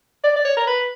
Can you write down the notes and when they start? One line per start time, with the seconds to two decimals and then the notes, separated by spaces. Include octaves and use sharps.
0.24 D5
0.36 D5
0.45 C#5
0.57 A#4
0.67 B4